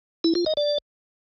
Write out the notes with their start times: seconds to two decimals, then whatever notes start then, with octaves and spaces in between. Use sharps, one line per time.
0.24 E4
0.35 F4
0.46 D#5
0.57 D5